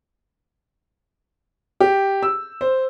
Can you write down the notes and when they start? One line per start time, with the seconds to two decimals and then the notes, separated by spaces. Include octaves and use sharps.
1.81 G4
2.23 E6
2.61 C5